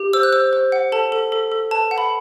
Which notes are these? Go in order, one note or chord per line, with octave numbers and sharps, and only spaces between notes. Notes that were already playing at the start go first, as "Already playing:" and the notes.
Already playing: G4
C5 E6
F#6
C5 E6
C5
F#5
A4 A5
A4
A4
A4
B4 A5
F#5
B5